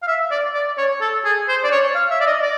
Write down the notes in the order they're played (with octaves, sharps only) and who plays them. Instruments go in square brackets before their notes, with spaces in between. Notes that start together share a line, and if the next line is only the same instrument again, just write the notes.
[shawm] F5
E5
D5
D5
C#5
A4
G#4
C5
D5
C#5
F5
E5
D5
D#5
D5